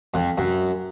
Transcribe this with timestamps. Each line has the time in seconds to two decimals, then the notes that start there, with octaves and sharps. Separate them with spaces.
0.14 F2
0.38 F#2